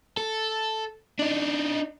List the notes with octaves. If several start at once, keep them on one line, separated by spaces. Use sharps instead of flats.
A4
D4 D#4